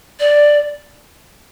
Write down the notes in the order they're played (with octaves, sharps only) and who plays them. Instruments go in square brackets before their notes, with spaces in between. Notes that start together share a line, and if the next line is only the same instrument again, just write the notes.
[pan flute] D5